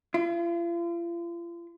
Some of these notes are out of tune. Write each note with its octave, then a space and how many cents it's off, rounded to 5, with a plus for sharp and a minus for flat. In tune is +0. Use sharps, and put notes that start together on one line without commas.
F4 -40